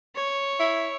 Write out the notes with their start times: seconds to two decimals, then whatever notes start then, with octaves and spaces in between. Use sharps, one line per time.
0.16 C#5
0.60 E4